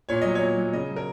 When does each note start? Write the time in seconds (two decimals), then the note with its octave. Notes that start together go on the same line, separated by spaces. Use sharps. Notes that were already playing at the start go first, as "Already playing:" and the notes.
0.09 A#2 C#5
0.21 F#3 D#5
0.35 C#5
0.41 A#2
0.57 F#3
0.73 C#3 D#5
0.89 F#3
0.96 A#4